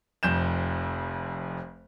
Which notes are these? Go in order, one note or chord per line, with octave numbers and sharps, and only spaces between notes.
F1 F2 G6 E7